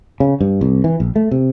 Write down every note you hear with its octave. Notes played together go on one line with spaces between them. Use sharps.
C#3
G2
C2
E3
A#1
A3
C3